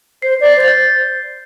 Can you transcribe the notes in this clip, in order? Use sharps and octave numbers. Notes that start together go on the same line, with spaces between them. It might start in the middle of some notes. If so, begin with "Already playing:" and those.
C5 C7
D5
A6
C7
C5 A6
G6